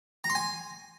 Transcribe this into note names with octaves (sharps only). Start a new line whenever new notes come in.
A#5
C6
G#5